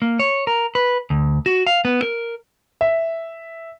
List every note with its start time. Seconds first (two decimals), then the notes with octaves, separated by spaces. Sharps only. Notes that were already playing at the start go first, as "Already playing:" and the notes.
0.02 A#3
0.19 C#5
0.47 A#4
0.75 B4
1.10 D2
1.46 F#4
1.67 F5
1.85 B3
2.02 A#4
2.81 E5